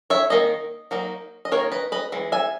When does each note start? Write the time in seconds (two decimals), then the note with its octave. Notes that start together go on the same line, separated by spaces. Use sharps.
0.10 C#5 E5
0.30 D#3 A#3 D#5
0.91 F#3 A#3 D#4
1.45 D#5
1.51 D#3 A#3 D#4 A#4 C#5
1.72 B4 D#5
1.92 B4 D#5
2.12 E3 G#3
2.32 E5 G#5